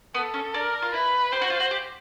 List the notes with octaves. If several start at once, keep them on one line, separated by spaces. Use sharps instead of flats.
B3 A4
C#4
D4 A#4
F4
E4 B4
G4 C5
F#4
F4
F#4
G4